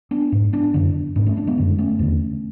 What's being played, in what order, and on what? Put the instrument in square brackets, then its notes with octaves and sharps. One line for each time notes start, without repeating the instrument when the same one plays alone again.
[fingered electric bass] B3 D4
G#2
B3 D4
F#2 D3
G#2 B3 D4
A3 C#4
B3 D4
G#3 B3
F#2 D3
A3 C#4
E2 D3